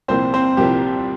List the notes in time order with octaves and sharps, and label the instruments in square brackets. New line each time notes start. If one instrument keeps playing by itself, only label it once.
[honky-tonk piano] C2 A#2 F3 A#3 E4 [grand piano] C4 C5
[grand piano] C4 C5
[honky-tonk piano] C2 A#2 F3 A#3 E4 [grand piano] G4